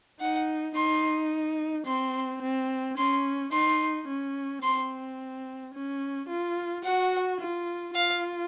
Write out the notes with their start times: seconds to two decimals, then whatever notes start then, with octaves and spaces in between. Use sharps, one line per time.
0.21 D#4 F#5
0.75 D#4 C6
1.86 C4 C6
2.42 C4
2.98 C#4 C6
3.52 D#4 C6
4.08 C#4
4.63 C4 C6
5.74 C#4
6.29 F4
6.84 F#4 F#5
7.40 F4
7.95 F4 F5